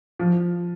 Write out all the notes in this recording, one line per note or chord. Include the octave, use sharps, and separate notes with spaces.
F3